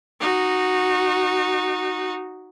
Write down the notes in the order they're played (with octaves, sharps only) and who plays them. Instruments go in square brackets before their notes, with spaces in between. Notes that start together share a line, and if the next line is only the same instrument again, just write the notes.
[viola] D#4 F#4